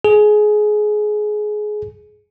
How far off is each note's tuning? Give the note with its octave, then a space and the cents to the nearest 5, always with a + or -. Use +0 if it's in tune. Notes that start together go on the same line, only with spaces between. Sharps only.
G#4 +20